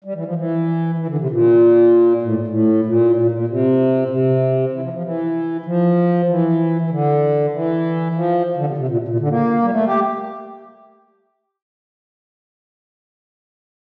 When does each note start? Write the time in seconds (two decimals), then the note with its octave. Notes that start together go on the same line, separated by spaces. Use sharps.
0.04 G3
0.15 E3
0.25 F3
0.35 E3
0.98 E3
1.08 D3
1.18 C3
1.29 A#2
2.22 A2
2.47 A2
2.85 A#2
3.16 A#2
3.31 A#2
3.48 C3
4.05 A#2
4.09 C3
4.72 E3
4.82 F3
4.93 F3
5.03 E3
5.61 E3
5.66 F3
6.28 E3
6.81 E3
6.90 D3
7.52 E3
8.15 F3
8.56 D3
8.67 C3
8.77 C3
8.88 A#2
9.08 A#2
9.19 D3
9.29 A#3
9.62 G3
9.71 A3
9.86 G4